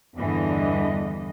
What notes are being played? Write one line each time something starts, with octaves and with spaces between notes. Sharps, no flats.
E2 G2 D3 E3 D#5